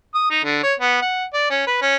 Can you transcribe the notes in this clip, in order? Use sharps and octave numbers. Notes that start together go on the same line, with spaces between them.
D#6
D#4
D3
C#5
B3
F#5
D5
C#4
B4
C#4